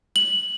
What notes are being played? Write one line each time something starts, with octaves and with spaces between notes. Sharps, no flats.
F#7